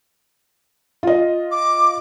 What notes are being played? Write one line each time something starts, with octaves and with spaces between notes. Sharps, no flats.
F4 D#5
D6